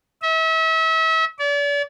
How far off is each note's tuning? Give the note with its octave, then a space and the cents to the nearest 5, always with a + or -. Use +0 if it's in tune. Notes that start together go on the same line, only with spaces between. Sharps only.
E5 -35
D5 -40